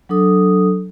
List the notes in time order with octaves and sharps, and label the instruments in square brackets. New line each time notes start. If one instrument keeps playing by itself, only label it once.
[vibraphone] F#3 D4 A4 D#6